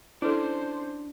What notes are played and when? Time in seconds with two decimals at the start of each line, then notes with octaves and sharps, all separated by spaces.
0.22 C#4 D4 E4 A4 C5